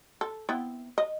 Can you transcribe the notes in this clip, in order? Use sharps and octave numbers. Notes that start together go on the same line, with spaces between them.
A4
B3 C4 E4
D#5